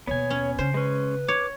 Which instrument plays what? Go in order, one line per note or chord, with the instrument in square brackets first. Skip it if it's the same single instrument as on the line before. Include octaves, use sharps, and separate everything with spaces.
[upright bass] D#2 B2 [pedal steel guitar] B3 G#5 [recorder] C#5
[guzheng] C#4
[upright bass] C#3 [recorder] C#4 [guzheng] C5
[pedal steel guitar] G#3 C#4 [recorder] B4
[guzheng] C#5 [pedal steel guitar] D6